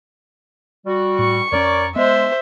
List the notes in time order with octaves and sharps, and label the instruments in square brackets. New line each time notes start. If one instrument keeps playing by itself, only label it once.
[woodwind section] G3 F#4
[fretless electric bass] A2 [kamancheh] C#6
[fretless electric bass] F2 C4 C#4 [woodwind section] A#4 C#5 D5
[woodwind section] G#3 [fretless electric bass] B3 [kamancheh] C5 E5